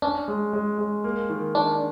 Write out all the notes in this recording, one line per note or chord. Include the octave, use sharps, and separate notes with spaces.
C#4 D4
G#3
G#3
G#3
A#3
D#3
D#3 D4